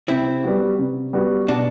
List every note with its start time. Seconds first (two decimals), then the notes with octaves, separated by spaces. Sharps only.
0.08 C3 C4 E4
0.43 G3 B3 F#4
0.79 C3
1.13 G3 B3 F#4
1.48 B2 D4 F#4